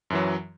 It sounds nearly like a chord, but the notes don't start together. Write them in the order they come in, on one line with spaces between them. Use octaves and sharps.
F#2 E3 F#3